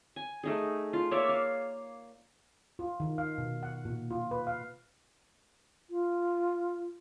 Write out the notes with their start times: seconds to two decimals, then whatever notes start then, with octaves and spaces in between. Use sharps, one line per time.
0.16 G#5
0.43 A3 D#4 G#4
0.93 F4
1.11 A#3 C#5 D5 E5
1.29 F5
2.79 F4
3.00 D#3
3.18 F5
3.38 B2
3.63 F#5
3.85 A#2
4.11 F4
4.31 B4
4.47 F5
5.90 F4